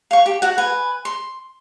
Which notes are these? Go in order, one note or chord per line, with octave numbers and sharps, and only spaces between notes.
F5 C#6
G4
F#4 F#5
B4 G#5
C6